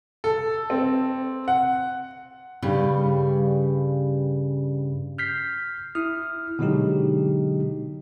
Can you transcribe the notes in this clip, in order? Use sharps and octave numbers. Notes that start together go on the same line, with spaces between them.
A4
C4
F#5
G2 C#3 G3
F6 G6 B6 C7
E4 D#6 F6
B2 D3 F#3 G#3 D#4 G4